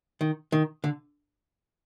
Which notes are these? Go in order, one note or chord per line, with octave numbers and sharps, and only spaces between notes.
D#3
D#3
D3